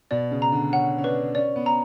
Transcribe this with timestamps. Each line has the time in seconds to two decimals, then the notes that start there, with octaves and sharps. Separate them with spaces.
0.11 B2 D5
0.31 C#3
0.42 A#5
0.52 D3
0.73 C#4 F#5
0.98 C#4
1.04 D4 B4
1.34 C#4 D5
1.56 B3
1.66 A#5